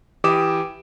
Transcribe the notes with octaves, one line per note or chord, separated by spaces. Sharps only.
E3 G4 D6 D#6 D7 E7